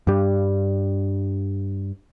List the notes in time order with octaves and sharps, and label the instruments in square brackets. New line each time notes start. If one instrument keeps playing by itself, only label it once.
[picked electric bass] G2 G3